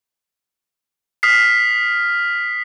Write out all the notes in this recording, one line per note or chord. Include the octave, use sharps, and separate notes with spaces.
D#6 F6 B6 C7